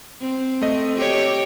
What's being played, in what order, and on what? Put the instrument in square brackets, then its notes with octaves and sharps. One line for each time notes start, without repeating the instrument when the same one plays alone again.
[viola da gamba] C4
[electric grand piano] A3 D#5
[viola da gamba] G4 C#5